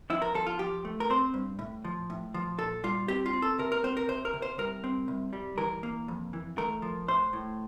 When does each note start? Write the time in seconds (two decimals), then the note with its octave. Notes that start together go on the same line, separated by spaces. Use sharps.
0.10 F3 E4
0.22 A#4
0.34 F3 A4
0.46 F4
0.59 F3 G4
0.85 A3
1.00 A#4
1.10 C4 C5
1.34 G2
1.59 A2
1.84 F3
2.10 A2
2.34 F3
2.58 A#2 A4
2.84 G3 F4
3.08 C4 G4
3.26 F4
3.33 C4
3.42 A4
3.58 C3 A#4
3.72 A#4
3.84 C4 C5
3.97 A#4
4.08 C3 C5
4.25 A#4
4.34 C3
4.42 C5
4.58 C2 A#4
4.84 C4
5.08 C2
5.33 G3
5.58 E3 A#4
5.83 A#3
6.08 F2
6.33 E3
6.58 A3 A#4
6.82 F3
7.08 A2 C5
7.33 A2